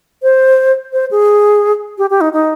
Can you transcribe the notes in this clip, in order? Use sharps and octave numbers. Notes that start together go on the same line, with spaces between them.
C5
C5
G#4
G4
G4
D#4
D#4